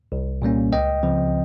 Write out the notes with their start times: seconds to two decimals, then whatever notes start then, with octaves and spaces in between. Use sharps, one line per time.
0.12 C2
0.42 A#2 G3 A#3 C#4
0.72 C#2 D#5 G5
1.03 C#3 F3 C4